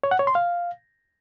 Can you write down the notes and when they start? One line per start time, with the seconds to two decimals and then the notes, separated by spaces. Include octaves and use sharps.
0.04 C#5
0.11 F#5
0.19 C#5
0.27 C6
0.35 F5